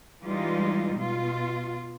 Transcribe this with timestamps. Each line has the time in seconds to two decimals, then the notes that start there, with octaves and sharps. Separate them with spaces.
0.23 E3 G3 G#3 D#4 F4
0.96 B2 F4